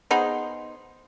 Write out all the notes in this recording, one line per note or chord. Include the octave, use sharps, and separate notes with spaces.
B3 D#4 G#4 C5